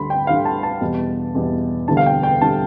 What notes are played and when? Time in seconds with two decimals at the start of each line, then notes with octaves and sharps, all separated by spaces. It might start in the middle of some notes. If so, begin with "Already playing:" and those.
Already playing: D2 D3 G3 B5 C6
0.10 G5
0.27 D2 D3 G3 F5
0.45 A5
0.63 A5
0.81 E2 B2 G3
1.35 E2 B2 G3
1.88 E1 D2 D3 G3 A5
1.97 F5
2.06 G5
2.23 G5
2.41 D3 G3 A5